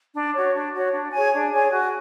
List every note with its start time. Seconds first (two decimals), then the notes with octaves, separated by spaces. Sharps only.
0.15 D4
0.35 F#4 C#5
0.54 D4
0.74 F#4 C#5
0.93 D4
1.13 G#4 C#5 G#5
1.33 D4
1.52 G#4 C#5 G#5
1.72 F#4